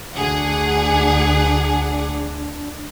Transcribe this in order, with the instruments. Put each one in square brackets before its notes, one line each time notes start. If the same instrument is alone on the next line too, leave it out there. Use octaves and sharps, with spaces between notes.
[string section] D2 G#4 F#5 [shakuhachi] D4